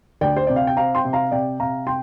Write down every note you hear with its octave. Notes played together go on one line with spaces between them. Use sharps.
D2 D5 G5
C5
C3 D5
F5
G5
C4 F5 A#5
G5 C6
C3
F5 A#5
C3 D5 G5
C3 F5 A#5
C3 G5 C6